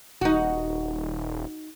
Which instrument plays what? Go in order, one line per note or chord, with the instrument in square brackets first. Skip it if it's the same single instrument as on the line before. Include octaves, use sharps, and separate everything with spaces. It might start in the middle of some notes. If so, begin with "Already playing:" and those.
[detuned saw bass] D#1 [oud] D#4 F#4